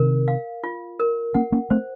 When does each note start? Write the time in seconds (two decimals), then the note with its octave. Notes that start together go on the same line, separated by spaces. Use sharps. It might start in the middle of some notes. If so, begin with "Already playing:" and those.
Already playing: C3 D#3 A#4
0.28 F5
0.64 F4
1.00 A#4
1.34 A#3 C#4 F#5
1.52 A#3 C#4
1.70 A3 C4 C5